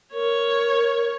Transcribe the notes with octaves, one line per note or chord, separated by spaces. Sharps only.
A#4 C#5